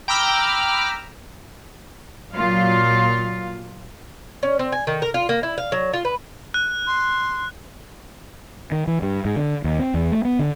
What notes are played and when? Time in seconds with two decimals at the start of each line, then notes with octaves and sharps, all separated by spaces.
0.08 G5 A#5 B5 D6 E6 F6
2.34 A#2 F#3 F4 F5
4.43 C#4
4.59 C4
4.72 G#5
4.87 D#3
5.02 A#4
5.14 F4
5.29 A#3
5.43 E4
5.58 F5
5.72 F#3
5.93 F4
6.05 B4
6.54 F#6
6.87 C6
8.72 D#3
8.87 E3
9.02 G2
9.25 G#2
9.36 D3
9.64 D#2
9.79 C4
9.94 E2
10.12 A3
10.25 B3
10.39 D3